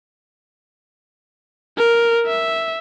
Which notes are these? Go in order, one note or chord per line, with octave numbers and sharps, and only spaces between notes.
A#4
E5